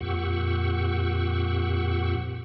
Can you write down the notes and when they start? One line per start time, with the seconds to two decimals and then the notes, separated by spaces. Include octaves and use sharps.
0.01 F2 A#2 G4 F#5 C#6 E6